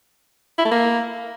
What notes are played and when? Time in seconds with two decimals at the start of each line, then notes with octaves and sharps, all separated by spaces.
0.58 E4
0.65 A3
0.71 A#3